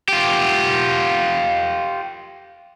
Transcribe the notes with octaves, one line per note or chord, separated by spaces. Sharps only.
F4 G4